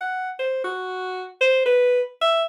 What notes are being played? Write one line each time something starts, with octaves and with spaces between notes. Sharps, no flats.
F#5
C5
F#4
C5
B4
E5